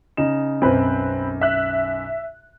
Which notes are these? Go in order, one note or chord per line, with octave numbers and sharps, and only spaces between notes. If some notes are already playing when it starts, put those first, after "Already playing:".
C#3 D#4 E7
B1 F#2 C4 B4
E5 F#6